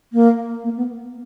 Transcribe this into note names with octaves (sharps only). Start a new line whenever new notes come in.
A#3
A#3
B3